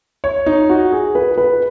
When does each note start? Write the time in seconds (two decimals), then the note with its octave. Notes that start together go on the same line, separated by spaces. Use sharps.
0.24 C#5
0.46 D#4
0.70 F#4
0.92 G#4
1.15 B4
1.38 B4